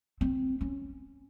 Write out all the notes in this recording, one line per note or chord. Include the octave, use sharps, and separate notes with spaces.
C4
C#4